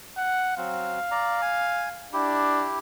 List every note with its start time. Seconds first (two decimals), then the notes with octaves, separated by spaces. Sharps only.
0.17 F#5
0.57 F#3 C4 F5
1.11 D5 A#5
1.42 G#5
2.13 D4 E4 G4